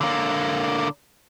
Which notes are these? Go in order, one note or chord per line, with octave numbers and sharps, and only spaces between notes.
D3 A#3